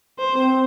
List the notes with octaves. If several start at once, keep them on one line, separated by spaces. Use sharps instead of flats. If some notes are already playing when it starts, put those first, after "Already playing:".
C5
C4